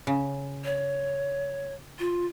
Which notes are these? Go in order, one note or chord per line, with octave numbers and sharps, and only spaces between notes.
C#3
C#5
F4